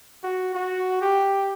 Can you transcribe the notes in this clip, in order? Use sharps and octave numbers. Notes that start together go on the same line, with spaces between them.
F#4
F#4
G4